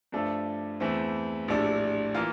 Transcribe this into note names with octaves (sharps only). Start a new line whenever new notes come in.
G2 F3 A3 D4 A4
E2 E3 A3 C4
A#1 A2 G3 D4 A4
E3 A#3 F4